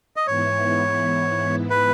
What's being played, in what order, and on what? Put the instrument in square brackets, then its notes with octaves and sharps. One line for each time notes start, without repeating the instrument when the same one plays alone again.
[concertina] D#5
[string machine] G#2 E3 B3 E4 [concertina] C#5
[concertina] B4